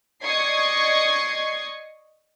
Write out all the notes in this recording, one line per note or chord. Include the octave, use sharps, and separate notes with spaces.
D5 D#5 C#6 D#6 G#6 C7